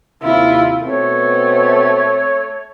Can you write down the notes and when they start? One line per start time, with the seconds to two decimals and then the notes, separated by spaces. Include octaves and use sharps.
0.23 D#2 C3 E4 F4
0.84 B2 A3 B3 C4 C#5